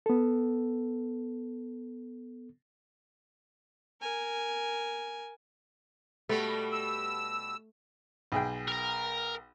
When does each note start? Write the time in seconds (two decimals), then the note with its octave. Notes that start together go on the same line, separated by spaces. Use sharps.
0.06 B3 A4
4.01 A#4 G#5
6.29 B2 G3 A3 B3
6.72 E6
8.32 B1 G#4 G5
8.68 A#4 A#5